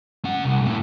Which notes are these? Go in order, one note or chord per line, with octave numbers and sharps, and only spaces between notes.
C#4 F#5
C2
B1 A2